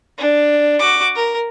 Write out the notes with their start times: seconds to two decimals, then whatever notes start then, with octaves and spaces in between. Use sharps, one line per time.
0.18 D4
0.79 F#4 D6
1.15 A#4